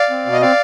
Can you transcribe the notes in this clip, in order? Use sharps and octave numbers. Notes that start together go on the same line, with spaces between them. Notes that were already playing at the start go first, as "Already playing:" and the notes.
Already playing: D5 F5
C4
B2
D#5
C4 D5 F5